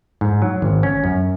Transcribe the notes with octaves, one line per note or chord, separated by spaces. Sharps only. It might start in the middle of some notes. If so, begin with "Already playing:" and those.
G#2
F#3
G#1
C#4
F#2